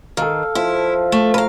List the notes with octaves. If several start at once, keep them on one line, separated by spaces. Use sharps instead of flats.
D#3 A4 F5
F3 E4
A3
A#4 B4 F5